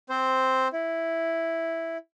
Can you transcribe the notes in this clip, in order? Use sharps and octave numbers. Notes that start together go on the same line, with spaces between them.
C4 C5
E4